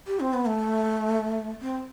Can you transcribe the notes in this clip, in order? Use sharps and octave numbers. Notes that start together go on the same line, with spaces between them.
G4
C4
B3
A3
C4